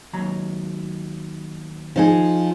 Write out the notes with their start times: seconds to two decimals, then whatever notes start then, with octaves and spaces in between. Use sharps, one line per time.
0.13 D#2 F#3 A#5
1.96 F3 D#4 G#4